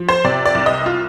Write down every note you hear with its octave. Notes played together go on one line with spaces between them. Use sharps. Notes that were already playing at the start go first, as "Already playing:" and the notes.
Already playing: F3
C5
C3 D5
D5
C2
D#5
F4